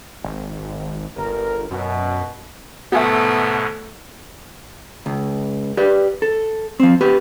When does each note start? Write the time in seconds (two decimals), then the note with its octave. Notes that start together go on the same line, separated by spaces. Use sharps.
0.24 G#1
1.17 G1 A#4
1.71 F#2 B2
2.92 G#2 B2 D3 A3 B3 F#4 G#4 E5
5.06 C#2
5.77 G4 B4 D5
6.22 A4
6.80 F3 C4
7.01 B3 G4 B4